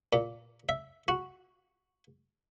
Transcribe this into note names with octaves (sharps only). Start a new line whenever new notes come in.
A#2
E5
F#4